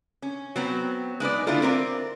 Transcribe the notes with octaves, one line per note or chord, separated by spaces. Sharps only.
C#4
F#3 B3 C4
G#3 D#4 B4 D5
D3 A#3 D4 E4 F4 A4
C4 A#4 B4 D5